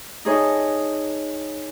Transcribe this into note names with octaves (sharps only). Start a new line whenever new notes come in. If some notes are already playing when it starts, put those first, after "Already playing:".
D#4 G#4 C#5 D#5 A5